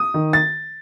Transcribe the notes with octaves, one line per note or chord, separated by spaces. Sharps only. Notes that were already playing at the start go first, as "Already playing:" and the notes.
Already playing: D#6
D#3
A6